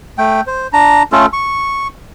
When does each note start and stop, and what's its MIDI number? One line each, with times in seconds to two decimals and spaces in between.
0.18 0.41 57
0.18 0.41 79
0.47 0.67 72
0.73 1.03 62
0.73 1.03 82
1.12 1.26 57
1.12 1.26 61
1.12 1.26 65
1.12 1.26 69
1.33 1.87 85